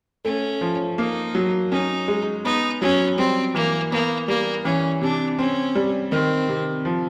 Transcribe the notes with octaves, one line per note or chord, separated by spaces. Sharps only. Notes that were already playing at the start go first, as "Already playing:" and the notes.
A3 C#4
F3
A#3 D#4
F#3
C#4 D#4
G#3
B3 D#4
F#3 C#4
G3 C4
E3 A#3
A#3 B3
G3 A#3
E3 C#4
C3 D4
C4 C#4
G3
D#3 C4
C3
F3